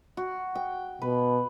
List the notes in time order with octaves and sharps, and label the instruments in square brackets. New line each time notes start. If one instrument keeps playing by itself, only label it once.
[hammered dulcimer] F#4
G5
[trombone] B2 [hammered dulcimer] B4